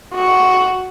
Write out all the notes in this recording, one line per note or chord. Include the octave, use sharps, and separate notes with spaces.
F#4